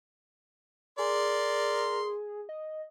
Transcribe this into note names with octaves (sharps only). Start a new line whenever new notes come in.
G#4 A#4 D5 C6
D#5